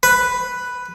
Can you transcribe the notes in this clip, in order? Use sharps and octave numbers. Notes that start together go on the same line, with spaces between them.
B4